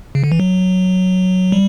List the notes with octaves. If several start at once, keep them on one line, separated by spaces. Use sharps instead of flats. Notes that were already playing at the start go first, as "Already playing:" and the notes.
C#3
D3
E3
F#3
G3